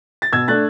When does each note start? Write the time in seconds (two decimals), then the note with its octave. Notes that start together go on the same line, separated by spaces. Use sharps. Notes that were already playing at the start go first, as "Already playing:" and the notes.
0.22 A6
0.33 B2 E6 G#6
0.48 A3 D4 F#6 A6